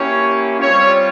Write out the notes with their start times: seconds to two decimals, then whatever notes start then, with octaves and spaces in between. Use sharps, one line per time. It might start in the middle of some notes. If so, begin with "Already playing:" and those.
Already playing: A#3 C#4 E4 G4 C#5
0.60 G3 C4 F4 C#5